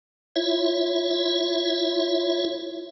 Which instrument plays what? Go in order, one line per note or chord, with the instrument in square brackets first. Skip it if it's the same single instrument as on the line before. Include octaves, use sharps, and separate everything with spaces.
[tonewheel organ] E4 F4 C#5 E5